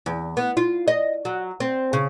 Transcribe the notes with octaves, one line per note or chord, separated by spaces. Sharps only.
E2
B3
F4
D#5
F#3
C4
C#3